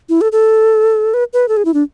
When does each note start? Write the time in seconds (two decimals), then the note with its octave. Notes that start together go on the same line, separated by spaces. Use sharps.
0.09 E4
0.21 A4
0.32 A4
1.14 B4
1.33 B4
1.48 A4
1.57 G#4
1.65 E4
1.74 D4